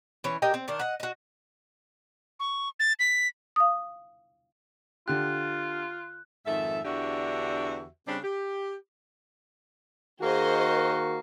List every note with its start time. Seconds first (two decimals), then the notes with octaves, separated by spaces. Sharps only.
0.24 E3 C#4 C#5
0.42 A#3 G4 D#5 G5
0.54 C4
0.68 D#3 D4 F5
0.79 D#5 F#5
1.00 F#4 D#5
2.40 C#6
2.80 A6
3.00 B6
3.56 F5 D#6
5.08 D3 F4 G4 F#6
6.46 F2 G#2 D#3 A4 E5
6.85 E2 D3 D4 F#4 G4 E5
8.07 C#3 G3 C4 D4
8.23 G4
10.21 D#3 A#3 F#4 G#4 C5 D#5